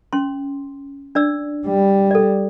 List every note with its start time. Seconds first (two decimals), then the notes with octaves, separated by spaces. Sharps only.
0.13 C#4 C6
1.15 D4 D5 E6
1.66 G3
2.11 A4 D5